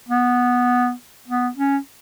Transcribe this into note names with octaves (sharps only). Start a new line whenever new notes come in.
B3
B3
C#4